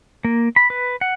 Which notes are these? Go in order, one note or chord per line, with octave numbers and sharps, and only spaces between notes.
A#3
B5
B4
F#5